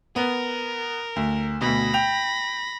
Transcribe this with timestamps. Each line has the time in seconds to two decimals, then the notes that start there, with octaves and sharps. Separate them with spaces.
0.16 B3 A#4
1.16 D2
1.61 D2 B2 B5 A#6
1.94 G5 F7